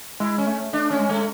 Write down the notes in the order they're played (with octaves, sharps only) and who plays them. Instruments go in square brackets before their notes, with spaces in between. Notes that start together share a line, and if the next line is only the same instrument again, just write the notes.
[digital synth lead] G#3 [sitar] E4
[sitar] C#4
[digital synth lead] A3
[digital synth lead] A3 [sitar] D4
[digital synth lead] A3 [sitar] C#4
[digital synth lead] G#3
[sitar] A3